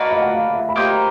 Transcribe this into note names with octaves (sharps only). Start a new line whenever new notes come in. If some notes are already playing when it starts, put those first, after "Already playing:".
Already playing: A#3 D4 F#4 B4 D#5
D#5
F#5
F5
E5
B5
A#3 D#4 G4 C5 A#5